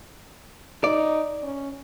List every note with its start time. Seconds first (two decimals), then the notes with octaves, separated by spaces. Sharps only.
0.84 D#4 D5
1.43 C#4